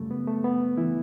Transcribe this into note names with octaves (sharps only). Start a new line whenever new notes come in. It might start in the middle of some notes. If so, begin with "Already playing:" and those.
Already playing: F#2 C#3 G3 A3
B3
A3
B3
E3 E4